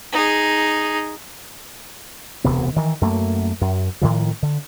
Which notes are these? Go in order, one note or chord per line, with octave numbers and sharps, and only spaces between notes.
D#4 G#4
E1 D2 C3 B3
D#3 E3
F#2 A3 A#3
F#2
A2 D#3 F3
D3